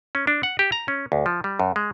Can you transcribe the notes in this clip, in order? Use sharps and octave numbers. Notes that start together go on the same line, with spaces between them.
C#4
D4
F#5
G4
A#5
C#4
D2
F3
G3
F#2
G#3